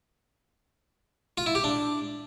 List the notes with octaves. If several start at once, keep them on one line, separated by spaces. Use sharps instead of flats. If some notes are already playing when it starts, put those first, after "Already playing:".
F4
E4
G4
D4